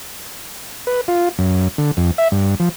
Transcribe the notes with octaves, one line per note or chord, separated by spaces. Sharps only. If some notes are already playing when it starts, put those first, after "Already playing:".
B4
F4
F#2
D3
F2
E5
G2
F3